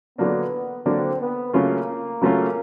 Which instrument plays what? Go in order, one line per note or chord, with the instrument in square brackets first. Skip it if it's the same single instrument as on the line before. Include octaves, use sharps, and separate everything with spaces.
[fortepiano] D3 F#3 A#3 D4 [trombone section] B3
[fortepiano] D3 F#3 A#3 D4 [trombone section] C4
[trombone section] B3
[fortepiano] C#3 F#3 A3 C#4 F4 [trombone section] A#3
[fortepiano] C#3 F#3 A3 C#4 F4